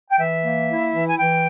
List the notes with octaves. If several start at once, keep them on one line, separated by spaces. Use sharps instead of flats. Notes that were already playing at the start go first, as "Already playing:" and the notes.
G5
E3 E5
A#3
E4
E3
G#5
E3 G5